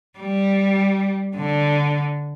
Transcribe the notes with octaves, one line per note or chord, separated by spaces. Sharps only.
G3
D3